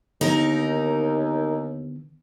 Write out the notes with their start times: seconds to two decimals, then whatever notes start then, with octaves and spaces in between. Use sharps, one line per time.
0.21 D#2 D3 D#3 B3 D#4 A#4